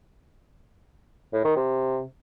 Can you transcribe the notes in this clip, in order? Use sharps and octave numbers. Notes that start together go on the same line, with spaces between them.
A2
D#3
C3